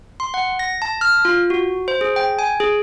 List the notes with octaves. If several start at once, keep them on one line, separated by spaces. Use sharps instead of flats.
C6
F#5
A#6
A5
F6
F4
F#4
C5
G#4
G5
G#5
G#4